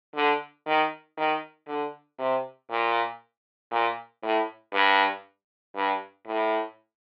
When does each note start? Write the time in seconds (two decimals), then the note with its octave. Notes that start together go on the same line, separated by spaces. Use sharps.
0.15 D3
0.66 D#3
1.18 D#3
1.68 D3
2.19 C3
2.70 A#2
3.71 A#2
4.23 A2
4.73 G2
5.76 G2
6.27 A2